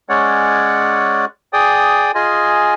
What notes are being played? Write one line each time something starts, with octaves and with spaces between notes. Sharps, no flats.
G#3 C#4 C#5 D5 F#5
G#4 D5 G5 D#6
F4 G#4 D#5 G#5